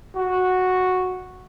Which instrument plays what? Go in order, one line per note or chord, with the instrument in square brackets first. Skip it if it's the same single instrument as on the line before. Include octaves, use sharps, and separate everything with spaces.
[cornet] F#4